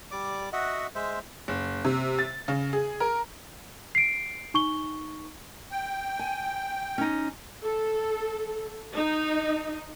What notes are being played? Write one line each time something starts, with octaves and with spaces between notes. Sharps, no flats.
G3 D5 D6
F#4 D#5 E5 F#5
G#3 C5 E5
F#1
C3
A6
C#3
G#4
A#4
C7 D7
D#4 C#6 G7
G5
G#5
C#4 D#4
A4
D#4